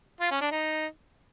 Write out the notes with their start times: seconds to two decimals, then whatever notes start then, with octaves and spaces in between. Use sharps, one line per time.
0.20 F4
0.31 C#4
0.41 D4
0.52 D#4